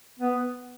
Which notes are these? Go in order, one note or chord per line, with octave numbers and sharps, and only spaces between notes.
B3